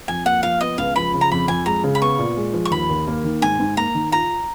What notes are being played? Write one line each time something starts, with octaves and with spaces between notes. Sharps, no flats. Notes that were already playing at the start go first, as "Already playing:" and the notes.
F2 G#5
A#3 F#5
F3 F5
B3 D#5
C#2 F5
F3 B5
C#3
A#5
F2 B5
F2 G#5
G#3 A#5
C#3
B5
B3 C#6
A#2
G#3
F3
C#6
D#2 B5
D#2
A#3
D#3
G#2 G#5
G#2
A#3 A#5
D#3
F4 A#5